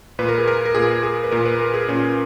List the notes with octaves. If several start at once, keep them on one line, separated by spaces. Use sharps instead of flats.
A#2 B4
A#4
G#4
A#4
A#4
A#2 G#4
G#4
B4
A#2 A#4
B4
A#4
G#4
A#2 C#4